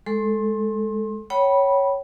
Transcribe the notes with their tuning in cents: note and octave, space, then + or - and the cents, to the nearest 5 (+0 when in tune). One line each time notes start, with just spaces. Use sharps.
G#3 +0 A4 +0 C6 +30
C#5 +0 G5 -35 B5 -15